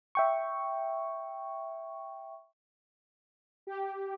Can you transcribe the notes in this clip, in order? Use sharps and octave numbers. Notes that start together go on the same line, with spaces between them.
E5 G5 C#6
G4